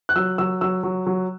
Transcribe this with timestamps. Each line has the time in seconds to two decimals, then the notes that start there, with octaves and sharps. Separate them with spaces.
0.09 F#6
0.15 F#3 E6
0.38 F#3 E6
0.61 F#3 E6
0.83 F#3
1.07 F#3